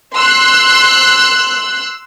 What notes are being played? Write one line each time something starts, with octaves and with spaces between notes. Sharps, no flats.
C6 E6 F#6